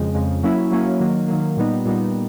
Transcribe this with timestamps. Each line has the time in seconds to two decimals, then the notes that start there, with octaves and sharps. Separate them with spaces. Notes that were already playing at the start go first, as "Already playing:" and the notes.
Already playing: F2 C#3 F3 G#3
0.14 F2 C#3 F3 G#3
0.43 F#3 A#3 C#4 E4
0.71 F#3 A#3 C#4 E4
1.00 D#3 F#3 A#3
1.28 D#3 F#3 A#3
1.57 A#2 G3 B3 D#4
1.85 A#2 G3 B3 D#4